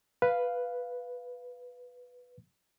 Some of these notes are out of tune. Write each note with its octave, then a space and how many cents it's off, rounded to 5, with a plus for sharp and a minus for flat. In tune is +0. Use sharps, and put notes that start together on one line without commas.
B4 +0 F5 +0